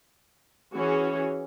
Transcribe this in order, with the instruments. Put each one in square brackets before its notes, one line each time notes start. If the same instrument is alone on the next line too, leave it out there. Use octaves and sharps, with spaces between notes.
[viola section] E3 C#4 F#4 G#4 C#5